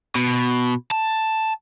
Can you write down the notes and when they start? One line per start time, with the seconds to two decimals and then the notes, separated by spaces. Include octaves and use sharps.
0.15 B2
0.91 A5